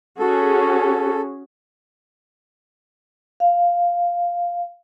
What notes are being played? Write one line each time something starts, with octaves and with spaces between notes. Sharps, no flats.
C#4 F#4 G#4 A4
F5